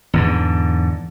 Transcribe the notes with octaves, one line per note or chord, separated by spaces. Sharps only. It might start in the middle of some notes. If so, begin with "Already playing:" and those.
E2 G#2 D3